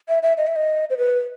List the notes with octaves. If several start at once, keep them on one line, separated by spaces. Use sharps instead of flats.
E5
E5
D#5
E5
D#5
C5
B4